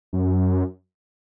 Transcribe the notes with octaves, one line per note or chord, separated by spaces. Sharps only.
F#2